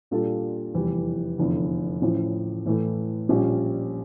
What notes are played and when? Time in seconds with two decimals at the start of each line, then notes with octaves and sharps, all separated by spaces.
0.11 A#2 G3 D4 F4 A4
0.74 F1 E2 E3 G3
1.38 F1 E2 D3
2.02 A1 A2 F3 C#4
2.66 A2 E3 A3
3.29 A#1 A#2 G3 C#4